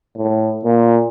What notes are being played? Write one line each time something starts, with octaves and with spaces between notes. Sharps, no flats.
A2
A#2